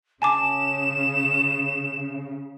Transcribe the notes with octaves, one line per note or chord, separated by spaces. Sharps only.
C#3 G#5 A5 D6 E7